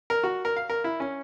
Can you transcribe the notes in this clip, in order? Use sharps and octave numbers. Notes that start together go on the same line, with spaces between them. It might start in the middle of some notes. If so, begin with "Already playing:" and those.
A#4
F#4
A#4
F5
A#4
E4
C#4